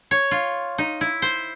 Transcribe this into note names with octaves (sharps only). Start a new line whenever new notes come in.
C#5
F4
D#4
E4
C5